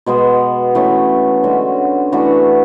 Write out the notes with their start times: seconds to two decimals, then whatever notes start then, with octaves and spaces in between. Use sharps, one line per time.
0.06 B2 G#3 B3
0.75 E3 A3 C#4
1.44 D3 G#3 C#4 F#4
2.12 E3 A3 D4 F#4